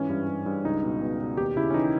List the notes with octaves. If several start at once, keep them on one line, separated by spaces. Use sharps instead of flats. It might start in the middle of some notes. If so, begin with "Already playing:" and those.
Already playing: G#2 E3 C#4
G2
G2
G2
C#2 D#4
B2
B2
B2
D#2 G4
C#3 E4
C#4
E3 D#4